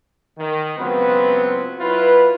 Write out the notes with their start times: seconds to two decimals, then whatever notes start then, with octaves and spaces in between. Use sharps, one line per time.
0.38 D#3
0.78 C#2 F#3 B3 C4 F4 B4
1.80 F#3 E4 F4 B4